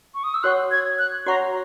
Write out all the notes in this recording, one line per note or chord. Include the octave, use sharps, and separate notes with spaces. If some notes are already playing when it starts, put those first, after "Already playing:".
C#6
D#6
E6
F#4 C#5 F#5 C#6 F#6
G#6
F#6
F#4 C#5 F#5 A#5 C#6